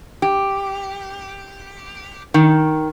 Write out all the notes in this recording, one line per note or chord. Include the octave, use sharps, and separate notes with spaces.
G4
D#3